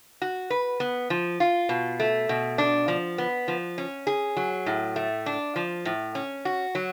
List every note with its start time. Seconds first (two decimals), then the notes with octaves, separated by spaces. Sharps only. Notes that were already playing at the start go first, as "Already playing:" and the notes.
0.22 F#4
0.50 B4
0.80 B3
1.10 F3
1.40 F4
1.69 B2
2.00 A3
2.29 B2
2.58 D4
2.88 F3
3.18 B3
3.48 F3
3.78 C#4
4.07 G#4
4.37 F#3
4.66 A2
4.96 A3
5.26 D4
5.56 F3
5.85 A2
6.15 C#4
6.45 F#4
6.75 F#3